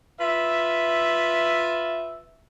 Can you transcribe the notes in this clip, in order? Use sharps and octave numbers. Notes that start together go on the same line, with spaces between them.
F4 B4 E5